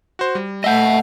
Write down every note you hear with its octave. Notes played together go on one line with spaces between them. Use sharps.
F#4 C5
G3
A3 D#5 E5 F#5 G6